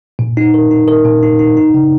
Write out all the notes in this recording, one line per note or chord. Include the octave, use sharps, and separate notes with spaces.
A#2
D#4
A#4
D#4
A#4
A#2
D#4
D#4
D#4
C#3